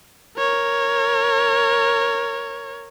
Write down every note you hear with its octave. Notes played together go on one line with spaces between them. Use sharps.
A#4 C#5